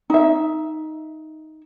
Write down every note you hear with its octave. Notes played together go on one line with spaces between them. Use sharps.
D#4 E5